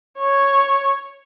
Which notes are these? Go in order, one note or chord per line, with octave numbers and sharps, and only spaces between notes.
C#5